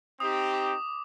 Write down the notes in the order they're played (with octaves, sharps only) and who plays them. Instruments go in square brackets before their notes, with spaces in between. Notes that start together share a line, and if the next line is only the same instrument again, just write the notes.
[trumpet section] C4 D#4 G4 [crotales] D#6
[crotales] D6